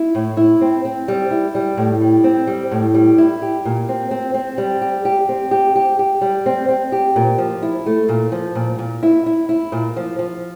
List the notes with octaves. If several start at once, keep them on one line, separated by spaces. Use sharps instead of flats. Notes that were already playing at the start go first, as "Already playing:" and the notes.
Already playing: E4
A2
E4
C4
C4
G3
E4
G3
A2
G3
C4
G3
A2
G3
E4
G4
A#2
C4
C4
C4
G3
G4
G4
C4
G4
G4
G4
G3
C4
C4
G4
A#2
F3
E4
A3
A#2
F3
A#2
A#2
E4
E4
E4
A#2
F3
F3